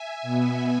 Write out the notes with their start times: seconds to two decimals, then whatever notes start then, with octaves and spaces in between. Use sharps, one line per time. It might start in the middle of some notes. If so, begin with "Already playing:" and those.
Already playing: E5 G#5
0.22 B2 B3